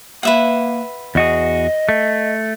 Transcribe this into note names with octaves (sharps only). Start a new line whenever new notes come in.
A#3 B4 E5 F#5
E2 F#4 G#4 D#5
A3